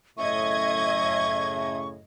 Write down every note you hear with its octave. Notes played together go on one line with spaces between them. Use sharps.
F#2 A2 C#3 D#5 E5 C#6 G#6